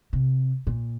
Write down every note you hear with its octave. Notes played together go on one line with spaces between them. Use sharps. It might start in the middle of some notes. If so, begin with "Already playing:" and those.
C3
A#2